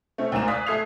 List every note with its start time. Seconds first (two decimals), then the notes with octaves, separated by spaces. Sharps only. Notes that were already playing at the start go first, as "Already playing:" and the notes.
0.18 A3 C4 C#4
0.32 D2 G#2 A#4 A#5 E7
0.48 D5 F5 G#5 D#6 F#6 B6
0.66 A3 A4 D#6 G#6 C7 F7